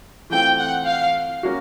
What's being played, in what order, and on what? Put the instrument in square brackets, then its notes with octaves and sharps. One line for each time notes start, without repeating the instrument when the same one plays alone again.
[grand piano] E3 A3 C4 F4 [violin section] G5
[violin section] F#5
F5
[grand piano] A#3 C#4 F#4